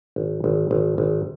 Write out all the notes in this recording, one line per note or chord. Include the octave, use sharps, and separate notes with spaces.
G#1
G#1
G#1
G#1